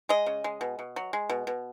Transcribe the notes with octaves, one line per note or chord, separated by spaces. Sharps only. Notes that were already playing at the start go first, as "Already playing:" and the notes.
G#3 D#5
C#3
G#3
B2
B2
F#3
G#3
B2
B2